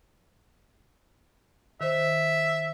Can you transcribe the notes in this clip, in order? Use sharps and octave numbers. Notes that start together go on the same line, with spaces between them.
D#3 C5 E5